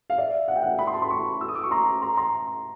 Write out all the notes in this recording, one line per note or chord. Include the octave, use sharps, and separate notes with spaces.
F5
D5 E5
F#5
G5
E5 F#5
B5
C6
A5 B5
C6
B5 C#6
E6
D#6
D6
C#6
A#5 C6
A#5 C6
A#5 C6